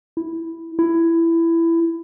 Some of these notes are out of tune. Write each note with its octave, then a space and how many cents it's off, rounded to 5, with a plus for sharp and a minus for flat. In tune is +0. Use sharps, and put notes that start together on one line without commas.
E4 +0
E4 +15